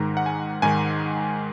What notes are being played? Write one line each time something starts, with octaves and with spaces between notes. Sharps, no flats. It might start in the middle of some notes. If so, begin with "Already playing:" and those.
Already playing: G#2 D#3 A#5
F#5
G#5
G#2 D#3 G#5